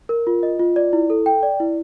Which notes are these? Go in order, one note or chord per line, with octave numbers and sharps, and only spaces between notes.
A#4
F4
D#5
F4
D5
E4
A4
G5
D5
E4